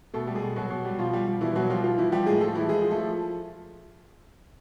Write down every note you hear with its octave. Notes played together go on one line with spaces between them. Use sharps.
B2 A3 A4
G3
G#3 G#4
B2
B2 F#3 F#4
B2
G3
B2 F3 F4
G3
G3
B2 E3 E4
B2 F#3 F#4
F3 G3 F4
F3 F4
E3 F3 E4
F3 G3 G4
A2 G#3 G#4
F3 A3 A4
E3 F3 E4
F3 G#3 G#4
F3
A3 A4
F3